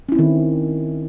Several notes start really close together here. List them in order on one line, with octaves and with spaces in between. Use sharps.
C#4 E4 C4 D#3